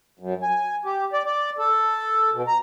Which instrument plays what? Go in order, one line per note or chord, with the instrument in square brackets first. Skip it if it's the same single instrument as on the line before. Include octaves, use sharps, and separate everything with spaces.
[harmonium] F#2
G#5
G4
D5
D5
A4
B2
A#5